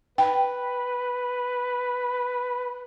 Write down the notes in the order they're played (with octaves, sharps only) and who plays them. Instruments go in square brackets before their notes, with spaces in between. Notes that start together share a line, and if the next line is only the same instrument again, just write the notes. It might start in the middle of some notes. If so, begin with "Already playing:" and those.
[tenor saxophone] B4 [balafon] G5